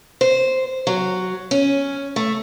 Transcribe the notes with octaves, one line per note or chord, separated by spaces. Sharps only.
C5
F#3
C#4
A3